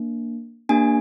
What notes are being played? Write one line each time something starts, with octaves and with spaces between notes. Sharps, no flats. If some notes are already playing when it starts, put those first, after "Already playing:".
Already playing: A#3 D4
A#3 D4 G4 G#5